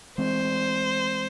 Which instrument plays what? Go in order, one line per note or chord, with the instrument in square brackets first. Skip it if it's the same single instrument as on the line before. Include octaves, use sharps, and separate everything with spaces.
[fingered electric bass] E3 G#3 C4 [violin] C5